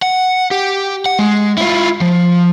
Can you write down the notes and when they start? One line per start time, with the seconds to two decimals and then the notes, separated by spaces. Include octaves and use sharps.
0.02 F#5
0.51 G4
1.06 F#5
1.19 G#3
1.58 E4 F4
2.01 F3